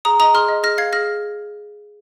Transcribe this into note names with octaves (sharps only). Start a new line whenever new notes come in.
G#4 A#5 D#6
D#5 A#5 D#6
G#4 C6 F6
D#5
G#4 F6 A#6
F5 G#6 C7
G#4 F6 A#6